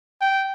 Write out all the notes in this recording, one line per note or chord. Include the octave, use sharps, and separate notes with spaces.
G5